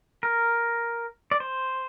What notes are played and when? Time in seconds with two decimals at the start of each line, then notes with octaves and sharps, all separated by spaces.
0.23 A#4
1.31 D5
1.40 C5